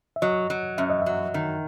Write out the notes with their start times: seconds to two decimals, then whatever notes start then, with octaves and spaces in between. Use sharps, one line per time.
0.16 E5
0.22 F#3 D#5
0.50 F#3
0.78 F#2 E5
0.90 D#5
1.02 F#3 E5
1.34 D#3